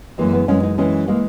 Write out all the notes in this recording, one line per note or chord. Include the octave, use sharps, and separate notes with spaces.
F#2 E3 G#3 A#3
B3
F#2 E3 G#3 C#4
D#4
F#2 E3 G#3 C#4
E3 G#3 A#3